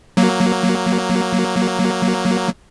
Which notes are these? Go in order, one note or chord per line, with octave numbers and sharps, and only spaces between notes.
F#3 A#3